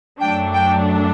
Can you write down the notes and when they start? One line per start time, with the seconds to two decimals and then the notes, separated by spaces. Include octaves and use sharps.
0.20 F#2 F#3 A3 D4 G5
0.55 G5